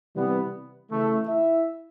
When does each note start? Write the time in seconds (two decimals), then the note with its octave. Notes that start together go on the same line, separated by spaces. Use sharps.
0.15 C3 E3 G3 B3
0.90 C#3 E3 A3
1.27 E4 E5